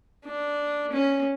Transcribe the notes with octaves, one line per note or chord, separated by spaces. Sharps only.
D4
C#4